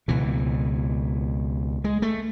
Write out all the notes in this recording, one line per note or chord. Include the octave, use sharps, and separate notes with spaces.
C#2 B2 E3
G#3
A3